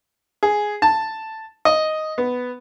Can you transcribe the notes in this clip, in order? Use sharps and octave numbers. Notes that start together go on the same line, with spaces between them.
G#4
A5
D#5
B3